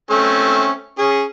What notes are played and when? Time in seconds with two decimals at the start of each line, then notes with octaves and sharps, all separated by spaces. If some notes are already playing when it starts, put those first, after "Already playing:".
0.10 A3 C4 C#4
0.99 C#4 G#4